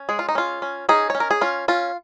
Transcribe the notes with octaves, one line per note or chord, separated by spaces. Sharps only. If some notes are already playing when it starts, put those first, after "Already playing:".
Already playing: C#4
G#3 G#4
F4
D#4
C#4 F4
C#4
C#4 D#4 G#4
C#4 C#5
A#4
G#4
C#4 F4
C#4 F4